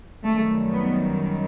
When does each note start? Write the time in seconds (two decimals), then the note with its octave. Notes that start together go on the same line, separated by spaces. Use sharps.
0.24 F#2 D#3 G3 A3
0.72 B3